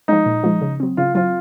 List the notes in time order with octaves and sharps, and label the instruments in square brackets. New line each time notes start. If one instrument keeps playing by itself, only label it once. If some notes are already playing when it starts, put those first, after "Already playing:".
[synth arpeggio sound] F3 G#3 [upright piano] D#4
[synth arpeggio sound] A#2
F3 G#3
C#3
F#3 C4
[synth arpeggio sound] C#3 [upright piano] F4
[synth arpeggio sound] F#3 C4 [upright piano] F4